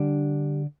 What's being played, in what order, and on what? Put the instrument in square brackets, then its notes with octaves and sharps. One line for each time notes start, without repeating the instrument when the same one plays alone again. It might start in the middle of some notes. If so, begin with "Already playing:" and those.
Already playing: [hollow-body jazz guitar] D3 G3 D4